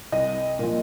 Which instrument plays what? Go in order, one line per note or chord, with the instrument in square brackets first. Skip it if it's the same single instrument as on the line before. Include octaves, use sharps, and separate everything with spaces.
[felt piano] C2 D#5
A#2 F3